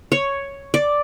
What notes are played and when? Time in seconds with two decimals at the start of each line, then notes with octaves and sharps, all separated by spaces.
0.12 C#5
0.74 D5